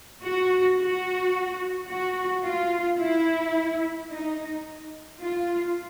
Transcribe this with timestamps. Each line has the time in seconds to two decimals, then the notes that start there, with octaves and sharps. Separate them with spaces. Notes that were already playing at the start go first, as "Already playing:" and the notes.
0.24 F#4
0.78 F#4
1.89 F#4
2.45 F4
2.99 E4
4.11 D#4
5.21 F4